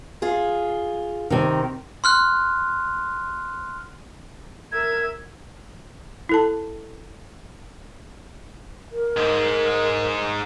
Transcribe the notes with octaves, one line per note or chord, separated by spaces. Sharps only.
F4 G#4
C3 D#3
C6 F6 F#6
A#4 E5 G#6
E4 A4 A5
A#4
G#2 G#3